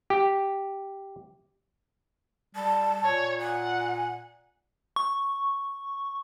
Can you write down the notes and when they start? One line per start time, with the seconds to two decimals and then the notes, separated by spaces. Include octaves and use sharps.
0.10 G4
2.55 G3 A5
3.04 A#2 C#5
3.41 F#5 G#5
4.96 C#6